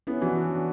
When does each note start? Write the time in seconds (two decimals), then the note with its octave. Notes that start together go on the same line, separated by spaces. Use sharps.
0.07 B3 C#4 E4
0.21 E3 D4 F#4